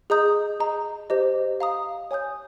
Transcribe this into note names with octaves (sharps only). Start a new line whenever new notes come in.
G#4 D#5 A#5 D#6 G6
G#4 D#5 A#5
G4 C5 D#5
F5 A#5 D#6
C#5 G#5 D#6 G6